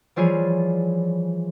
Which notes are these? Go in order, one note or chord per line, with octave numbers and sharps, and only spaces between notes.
E3 F3 G3 F4 G#4 C#5